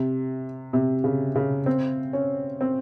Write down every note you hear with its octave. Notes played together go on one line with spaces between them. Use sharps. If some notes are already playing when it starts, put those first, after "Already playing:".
Already playing: C3
C3
C#3
C#3
C4
C#4
C4